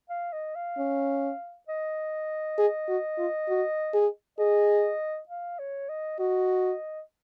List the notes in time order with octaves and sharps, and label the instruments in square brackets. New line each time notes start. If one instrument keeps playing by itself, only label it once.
[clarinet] F5
D#5
F5
[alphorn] C#4
[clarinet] D#5
[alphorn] G#4
F#4
F4
F#4
G#4
[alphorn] G#4 [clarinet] D#5
[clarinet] F5
C#5
D#5
[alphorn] F#4 [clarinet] D#5